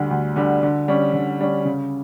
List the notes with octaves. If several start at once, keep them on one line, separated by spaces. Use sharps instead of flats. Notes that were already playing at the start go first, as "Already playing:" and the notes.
Already playing: D2 D3 G3
D2
D3 G3
D3
G3 C#4
D3
G3 C#4
C#3